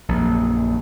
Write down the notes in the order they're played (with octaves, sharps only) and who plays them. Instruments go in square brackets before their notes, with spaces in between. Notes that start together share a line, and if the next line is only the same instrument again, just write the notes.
[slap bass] A#1 F#2